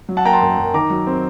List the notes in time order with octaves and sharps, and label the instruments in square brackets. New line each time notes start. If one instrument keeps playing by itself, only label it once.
[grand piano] F#3
F#5 A5
A#3 G5 A#5
A5 C6
F#2
F#2
D#3 A#5 D6
F#3
C4